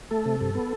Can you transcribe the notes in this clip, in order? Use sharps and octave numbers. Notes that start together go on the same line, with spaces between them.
A3 A4
C3
G2
B3